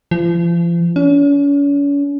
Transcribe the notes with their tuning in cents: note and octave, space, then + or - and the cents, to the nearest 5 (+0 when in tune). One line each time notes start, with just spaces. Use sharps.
F3 -40
C#4 +40